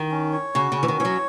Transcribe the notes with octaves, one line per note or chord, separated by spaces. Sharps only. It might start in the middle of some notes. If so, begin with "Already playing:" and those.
Already playing: D#3
C#4
C#5
C#3 F#4
C#3
C#4
E3
D#3
E3 C#5
F#3